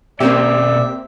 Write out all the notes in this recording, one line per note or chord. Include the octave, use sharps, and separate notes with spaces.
B2 A#3 C4 C#4 G4 D5 E5